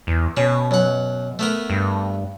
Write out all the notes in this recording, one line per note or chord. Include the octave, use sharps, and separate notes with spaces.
E2
B2 C#4
F#2 F#5
A3 B3 A#4
G2